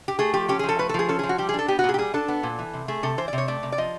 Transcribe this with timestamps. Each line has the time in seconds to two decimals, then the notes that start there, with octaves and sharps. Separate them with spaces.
0.08 G4
0.19 A3 G#4
0.34 F3 G4
0.49 C#4 G4
0.59 G#4
0.63 F3
0.69 A4
0.79 A3 B4
0.89 A4
0.94 F3 G#4
1.09 C#4 A4
1.19 F3 G#4
1.29 F#4
1.38 G3 G4
1.49 G#4
1.54 D4 A4
1.68 B3 G4
1.79 F#4
1.84 A#2 G#4
1.94 G4
1.98 G3 G#4
2.14 D4 A4
2.28 B3
2.43 A#2
2.59 E3
2.73 C3
2.88 A3 G#4
3.03 C3 A4
3.18 E3 C5
3.28 D5
3.33 C3
3.38 C#5
3.48 A3 D5
3.63 C3
3.72 D5
3.78 F3 D#5